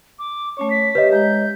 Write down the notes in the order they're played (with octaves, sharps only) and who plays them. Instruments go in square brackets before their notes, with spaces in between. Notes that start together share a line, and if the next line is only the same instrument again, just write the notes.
[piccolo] D6
[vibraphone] A3 C#4 C#5 [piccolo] C#6
[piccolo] B6
[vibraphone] G4 E5 [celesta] B4 C#5 D#5
[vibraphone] G#3 A#5 [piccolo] G6